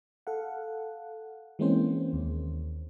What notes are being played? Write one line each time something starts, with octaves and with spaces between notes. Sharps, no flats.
A4 F5 F#5
E3 G#3 A#3 C4 C#4 C5
D#2